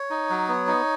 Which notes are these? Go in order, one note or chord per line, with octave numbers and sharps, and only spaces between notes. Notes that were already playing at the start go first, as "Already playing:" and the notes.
Already playing: C#5
D#4
F#3
B3
D#4